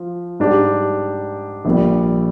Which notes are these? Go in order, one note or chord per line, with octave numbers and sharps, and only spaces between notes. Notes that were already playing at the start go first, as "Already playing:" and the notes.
Already playing: F3
G#2 G3 D4 G4
A#1 A#2 G3